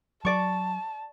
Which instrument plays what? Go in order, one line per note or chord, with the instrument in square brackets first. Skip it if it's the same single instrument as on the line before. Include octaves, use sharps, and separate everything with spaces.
[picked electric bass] F#3 [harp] D5 C#6 [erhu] A5